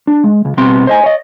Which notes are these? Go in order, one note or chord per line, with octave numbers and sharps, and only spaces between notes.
D4
G#3
C#2
B2 G3 B3 C4 C6
C5 D#5 G#5
C#5 D#5